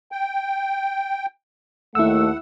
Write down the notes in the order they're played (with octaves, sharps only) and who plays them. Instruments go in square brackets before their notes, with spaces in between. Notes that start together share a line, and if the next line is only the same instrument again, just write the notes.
[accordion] G5
[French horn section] D#2 A3 [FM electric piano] E4 E6 [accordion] F#5